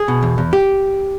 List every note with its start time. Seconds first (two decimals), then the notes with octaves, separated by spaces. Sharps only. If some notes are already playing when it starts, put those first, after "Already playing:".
Already playing: G#4
0.08 B2
0.23 E2
0.38 E2
0.53 G4